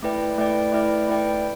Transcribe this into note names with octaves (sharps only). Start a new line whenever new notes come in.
A3 E4 B4 D5 G5
A3 E4 B4 D5 G5
A3 E4 B4 D5 G5
A3 E4 B4 D5 G5